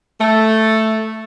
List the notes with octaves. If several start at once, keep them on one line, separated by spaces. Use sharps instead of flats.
A3